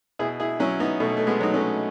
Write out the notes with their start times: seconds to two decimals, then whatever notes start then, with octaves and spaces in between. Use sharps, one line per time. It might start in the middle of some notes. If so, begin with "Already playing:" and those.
0.19 B2 E4 G#4
0.40 E4 G#4
0.60 F#3 C#4 E4
0.80 B3 D#4
1.00 B2 A3
1.17 A3
1.27 G#3 B3
1.41 F#3 D#4
1.54 A3 C#4